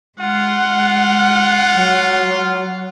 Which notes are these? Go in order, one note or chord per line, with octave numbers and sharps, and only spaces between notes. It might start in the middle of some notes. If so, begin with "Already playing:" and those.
G#3 F4 F#5
F#3